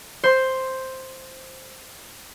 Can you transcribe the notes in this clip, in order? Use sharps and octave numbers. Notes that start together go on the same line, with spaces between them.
C5 C6